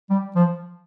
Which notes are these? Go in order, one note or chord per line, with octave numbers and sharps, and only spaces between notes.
G3
F3